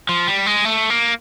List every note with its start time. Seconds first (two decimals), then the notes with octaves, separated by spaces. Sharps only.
0.09 F3
0.27 G3
0.46 G#3
0.65 A3
0.90 A#3